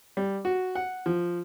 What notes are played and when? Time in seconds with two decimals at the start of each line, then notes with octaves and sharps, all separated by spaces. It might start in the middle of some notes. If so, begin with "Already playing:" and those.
0.17 G3
0.45 F#4
0.75 F#5
1.06 F3